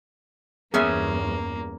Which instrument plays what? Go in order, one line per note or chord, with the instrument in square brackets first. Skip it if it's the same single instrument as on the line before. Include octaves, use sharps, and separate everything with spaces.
[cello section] E2 G2 [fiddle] A#3 [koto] B3 C#4 G#5 [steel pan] G#4 E5